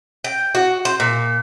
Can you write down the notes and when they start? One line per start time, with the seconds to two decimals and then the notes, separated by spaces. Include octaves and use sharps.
0.24 G5
0.55 F#4
0.85 C5
1.00 A#2